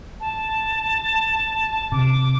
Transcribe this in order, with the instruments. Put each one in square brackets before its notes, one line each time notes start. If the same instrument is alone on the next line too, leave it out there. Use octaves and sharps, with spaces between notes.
[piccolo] A5
[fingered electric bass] C3 [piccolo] D6